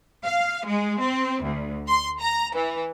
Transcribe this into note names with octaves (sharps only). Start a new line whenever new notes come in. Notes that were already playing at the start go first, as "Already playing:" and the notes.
F5
G#3
C4
D2
C6
A#5
E3